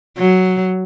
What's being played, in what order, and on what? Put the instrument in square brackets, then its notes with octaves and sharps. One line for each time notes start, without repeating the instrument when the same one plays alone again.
[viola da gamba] F#3